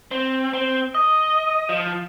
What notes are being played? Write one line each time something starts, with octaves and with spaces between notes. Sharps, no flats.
C4
C4
D#5
F3